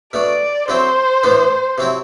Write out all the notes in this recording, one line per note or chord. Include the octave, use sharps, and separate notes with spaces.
B2 A3 D4 D5
D3 F#3 C4 E4 C5
A2 E3 B3 D4
C3 F#3 C4 E4